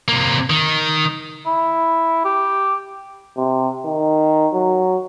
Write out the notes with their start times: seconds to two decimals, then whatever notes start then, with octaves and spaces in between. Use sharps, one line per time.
0.08 C3 A#3
0.50 D#3
1.46 E4
2.25 G4
3.37 C3
3.85 D#3
4.53 F#3